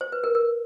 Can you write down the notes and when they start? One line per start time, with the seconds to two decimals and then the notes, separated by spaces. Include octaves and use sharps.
0.01 C5
0.12 B4
0.24 A#4
0.35 A#4